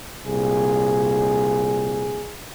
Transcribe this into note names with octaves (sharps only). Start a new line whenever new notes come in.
C2 A#2 G#4